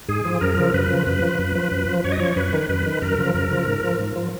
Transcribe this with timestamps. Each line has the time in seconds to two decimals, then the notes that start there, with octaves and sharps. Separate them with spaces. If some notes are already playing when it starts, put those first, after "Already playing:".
0.09 G#2 G#4
0.25 F3
0.41 F#2 A#4
0.57 C#3 F3
0.74 F#2 B4
0.90 C#3 F3
1.06 F#2 B4
1.22 F3
1.39 F#2
1.55 F3
1.71 F#2
1.88 F3
2.04 F#2 C#5
2.12 D#5
2.19 F3 C#5
2.36 F#2 B4
2.53 D#3
2.69 F#2 B4
2.86 D#3
3.02 F#2 A#4
3.18 C#3 F3
3.34 F#2 A#4
3.51 C#3 F3
3.67 G#2
3.84 F3
3.99 G#2
4.16 F3